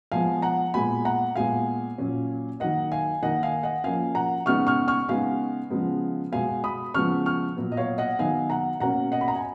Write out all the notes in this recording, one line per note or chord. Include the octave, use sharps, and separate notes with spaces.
F3 G#3 B3 F5 G#5
F#5 A#5
A#2 G#3 B3 G#5 B5
F#5 A#5
A#2 G#3 B3 F5 G#5
A#2 F#3 C#4
D#3 F#3 A#3 D#5 F#5
F5 G#5
D#3 A#3 D#4 D#5 F#5
F5 G#5
D#5 F#5
F3 A#3 C#4 F5 G#5
F#5 A#5
C#3 G#3 B3 D#4 C#6 F6
C#6 F6
C#6 F6
C#3 G#3 B3 D#4 F5 G#5
C#3 F3 G#3 B3
B2 G#3 B3 F5 G#5
B5 D#6
C#3 F3 G#3 B3 C#6 F6
C#6 F6
A#2 F#3 B3
D#5
C#5 F5
D#5 F#5
D#3 F#3 B3 D#4 F5 G#5
F#5 A#5
B2 A#3 C#4 F#5 A#5
D#5 F#5
B5
A#5
G#5